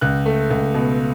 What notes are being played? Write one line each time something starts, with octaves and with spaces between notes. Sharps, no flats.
C#2 F#6
A3
C#2
B2